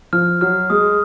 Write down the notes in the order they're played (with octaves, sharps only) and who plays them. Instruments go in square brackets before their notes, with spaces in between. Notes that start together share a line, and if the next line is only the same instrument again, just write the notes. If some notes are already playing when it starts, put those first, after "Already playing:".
[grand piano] F3 [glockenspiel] F6
[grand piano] F#3 [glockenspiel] F6
[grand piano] G#3 [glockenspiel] D#6